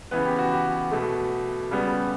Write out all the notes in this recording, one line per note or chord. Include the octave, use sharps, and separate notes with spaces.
C#3 E3 B3 B4
G4
F#4
G4
B2 A3
C#3 G3 B3